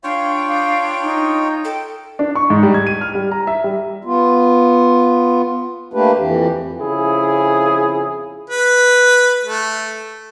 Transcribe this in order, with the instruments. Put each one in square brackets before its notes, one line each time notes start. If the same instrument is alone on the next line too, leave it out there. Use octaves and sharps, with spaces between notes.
[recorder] D4 [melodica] F4 C#5 G5 [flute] F5
[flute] F5
D#4
[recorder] A4 [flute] G5
[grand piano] D4
C#6
G#2
G3
G#6
D#7
F6
G3
A#5
E5
G3
[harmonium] B3 F4
A3 A#3 D4 G4 B4
F2 E3 G4
[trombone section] F2 C#3 E4 G#4
[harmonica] B4
A3